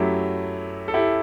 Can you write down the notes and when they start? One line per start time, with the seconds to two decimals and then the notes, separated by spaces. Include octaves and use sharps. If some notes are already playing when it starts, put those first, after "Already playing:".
Already playing: F#2 F#3 A3 E4 G4
0.88 A4
0.94 E4 G4